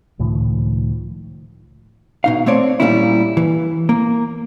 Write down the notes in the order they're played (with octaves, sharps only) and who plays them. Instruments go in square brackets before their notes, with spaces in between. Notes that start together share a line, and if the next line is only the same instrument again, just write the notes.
[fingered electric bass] C#2 A2 D#3 F3
[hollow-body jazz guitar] B2 D#4 F5
A3 C4 C#5 D5
A#2 G3 G#3 A#3 C#4 E4
E3
A#3